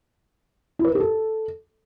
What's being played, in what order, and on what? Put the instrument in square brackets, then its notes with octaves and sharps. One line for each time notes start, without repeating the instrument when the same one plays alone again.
[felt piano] E4
B4
A#4
G4
A4